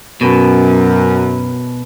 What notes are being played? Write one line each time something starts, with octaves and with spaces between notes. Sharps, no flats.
F#2 B2